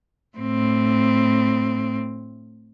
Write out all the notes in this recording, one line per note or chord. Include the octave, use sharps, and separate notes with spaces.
A2 C4